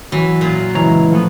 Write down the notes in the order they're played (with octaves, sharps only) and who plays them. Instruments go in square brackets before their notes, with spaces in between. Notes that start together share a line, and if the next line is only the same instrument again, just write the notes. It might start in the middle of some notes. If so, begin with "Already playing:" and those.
[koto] E3 [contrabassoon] F#3
[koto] A#2 F4
[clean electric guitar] C#2 C#5 A#5 [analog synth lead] E3
[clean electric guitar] F3 A3 B3